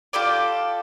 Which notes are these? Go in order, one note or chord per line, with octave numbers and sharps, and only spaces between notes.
F4 G4 A4 D5